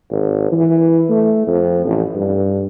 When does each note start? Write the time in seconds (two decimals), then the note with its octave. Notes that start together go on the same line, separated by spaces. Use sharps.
0.11 G#1
0.52 E3
1.10 A3
1.47 F2
1.85 A1
2.15 G2